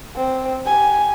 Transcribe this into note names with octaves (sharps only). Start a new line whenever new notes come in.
C4
G4 G#5